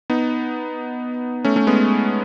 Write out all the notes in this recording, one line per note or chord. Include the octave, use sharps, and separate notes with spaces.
B3 D#4
A3 C#4
A3 C#4
G#3 B3